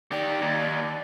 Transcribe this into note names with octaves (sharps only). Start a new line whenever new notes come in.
D#3 G4 D5
D#2